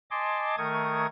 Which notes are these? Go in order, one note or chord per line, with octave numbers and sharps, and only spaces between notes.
D#5 G#5 A5 C6 D6
D#3 A3 A#4 C#6 D#6 G#6